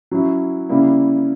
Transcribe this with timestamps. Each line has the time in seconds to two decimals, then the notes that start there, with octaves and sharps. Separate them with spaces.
0.11 F#3 C#4 E4
0.69 C#3 G3 A#3 E4